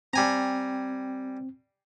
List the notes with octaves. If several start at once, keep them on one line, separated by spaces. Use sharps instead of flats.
G3 C4 G#5 A#5